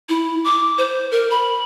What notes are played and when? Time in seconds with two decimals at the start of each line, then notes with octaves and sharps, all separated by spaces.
0.09 E4
0.45 D6
0.78 C5
1.11 A#4
1.30 B5